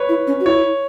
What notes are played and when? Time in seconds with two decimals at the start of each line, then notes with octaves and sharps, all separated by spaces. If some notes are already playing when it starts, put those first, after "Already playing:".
Already playing: B4 C#5
0.09 E4
0.27 C#4
0.40 F#4
0.46 E4 C#5